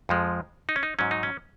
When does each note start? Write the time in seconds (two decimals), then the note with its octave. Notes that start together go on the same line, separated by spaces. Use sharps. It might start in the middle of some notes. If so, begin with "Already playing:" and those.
0.09 F2 F3 G#3
0.69 D#4
0.76 C#4
0.83 D#4
0.99 G#2 F#3 C#4
1.11 D#4
1.23 C#4